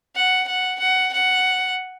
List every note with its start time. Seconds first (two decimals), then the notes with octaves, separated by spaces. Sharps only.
0.16 F#5
0.47 F#5
0.80 F#5
1.13 F#5